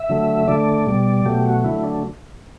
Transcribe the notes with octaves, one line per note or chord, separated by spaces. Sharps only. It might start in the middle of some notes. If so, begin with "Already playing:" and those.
Already playing: E5
D3 F#3 A3
D3 A3 D5
B2 G3
B2 F#3 A3 G4
F#4
D3 F#3 A3 E4
D4